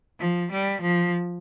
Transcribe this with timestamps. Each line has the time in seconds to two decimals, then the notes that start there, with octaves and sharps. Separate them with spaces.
0.20 F3
0.51 G3
0.82 F3